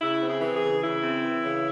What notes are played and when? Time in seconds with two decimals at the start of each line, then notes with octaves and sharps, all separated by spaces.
0.01 C#3 E4
0.21 C4
0.29 G#4
0.42 E3
0.56 G#4
0.63 C#3
0.83 C#3 E4
1.03 C4
1.23 E3
1.44 C#3